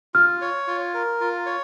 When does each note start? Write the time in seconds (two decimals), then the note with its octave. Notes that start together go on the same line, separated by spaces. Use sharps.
0.14 F4 F6
0.41 C#5
0.67 F4
0.94 A#4
1.21 F4
1.46 C#5